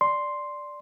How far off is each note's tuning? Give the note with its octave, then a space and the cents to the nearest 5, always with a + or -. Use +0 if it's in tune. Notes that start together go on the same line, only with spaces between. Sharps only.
D5 +0 C6 +0